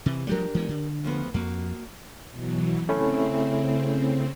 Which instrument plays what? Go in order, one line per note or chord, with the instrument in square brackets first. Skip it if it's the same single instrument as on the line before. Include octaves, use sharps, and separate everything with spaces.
[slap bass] C3 [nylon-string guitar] E3
[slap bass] F3 G3 A3 [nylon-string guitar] D4 G4 A#4
[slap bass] E3 G#3 B3
D3
[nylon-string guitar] D2 F3 B3
[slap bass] F2 [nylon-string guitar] A#3 F#4
[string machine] B2 E3 F#3
[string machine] C#3 C4 [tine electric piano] A3 C#4 E4